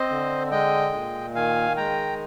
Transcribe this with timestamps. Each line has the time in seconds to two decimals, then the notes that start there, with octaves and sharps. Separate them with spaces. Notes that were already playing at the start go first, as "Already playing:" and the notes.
Already playing: C4 C5 D#5
0.10 D3
0.51 G#3 D#5 G5
0.93 A#2
1.35 D#3 F5 G#5
1.77 G#3 G5 A#5